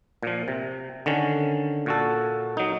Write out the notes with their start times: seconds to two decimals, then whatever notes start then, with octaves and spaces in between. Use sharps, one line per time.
0.23 A#2 F3
0.48 C3
1.06 D3 D#3 C#4
1.86 A#2 F#4 A4
2.57 F#3 D#4